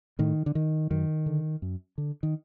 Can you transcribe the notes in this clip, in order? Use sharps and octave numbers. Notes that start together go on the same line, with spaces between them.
A2 D#3
D3
D#3
F#2 D#3
D3
F#2
D3
D#3